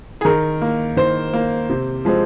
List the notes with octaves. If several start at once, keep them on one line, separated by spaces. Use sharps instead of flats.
G#4
D#3 A#4
A#3
D#3 C5
A#3
C3
F3 G#3 C4